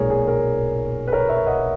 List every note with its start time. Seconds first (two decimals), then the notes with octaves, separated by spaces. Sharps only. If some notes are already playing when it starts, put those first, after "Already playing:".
Already playing: B1 A#2 G#3 G#4 A#4 C#5
0.10 G#4
0.27 A#4
1.08 B4
1.13 A#4 C#5
1.29 C#5 E5
1.47 D#5 F#5